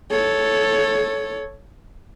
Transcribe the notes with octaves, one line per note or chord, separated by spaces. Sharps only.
A4 C#5